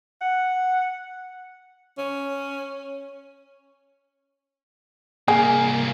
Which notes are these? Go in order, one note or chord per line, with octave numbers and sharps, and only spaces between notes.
F#5
C#4
C2 A#3 G#4 G#5